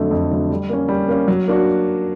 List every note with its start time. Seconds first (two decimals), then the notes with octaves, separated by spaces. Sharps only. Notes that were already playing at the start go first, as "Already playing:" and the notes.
Already playing: F2 D3 F#3 A3
0.11 F2
0.31 D3 F#3 A3
0.50 G3
0.69 A#3 C#4
0.89 G3
1.08 A#3 C#4
1.28 F#3
1.48 A#3 D4 F#4